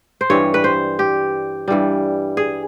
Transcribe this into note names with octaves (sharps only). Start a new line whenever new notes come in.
C5
G2 E3 G3 C#5
B4
C5
G4
G2 E3 G3
G#4